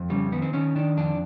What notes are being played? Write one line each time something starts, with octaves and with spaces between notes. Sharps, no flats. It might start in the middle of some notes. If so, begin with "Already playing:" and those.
Already playing: F2
C#3 G3
D#3 B3
C4
D#3 C#4
D#3 D4
F2 D4